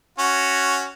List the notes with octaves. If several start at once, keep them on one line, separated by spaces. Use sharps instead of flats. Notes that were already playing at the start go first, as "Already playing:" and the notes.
C#4 F#4